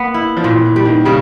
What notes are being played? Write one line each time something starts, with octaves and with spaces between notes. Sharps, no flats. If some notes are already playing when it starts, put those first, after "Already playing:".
Already playing: A#3 B3
E4
F3
A#2 E3
E3
G3
D#3
C#3 G3